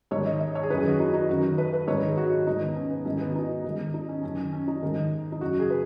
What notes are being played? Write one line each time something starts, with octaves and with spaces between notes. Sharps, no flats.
G#2 D#3 C#5
D#5
D#5
C#5
G#4
F#2 D#3 B4
G#4
F#4
D#4
D#4
F#2 D#3 F#4
B4
B4
G#2 D#3 C#5
B4
G#4
F#4
F#4
G#2 D#3 D#4
B3
C#4
B3
G#2 D#3 C#4
B3
F#4
D#4
G#2 D#3
D#4
C#4
F#2 D#3 C#4
C#4
D#4
G#2 D#3
D#4
F#2 C#3 F#4
G#4
B4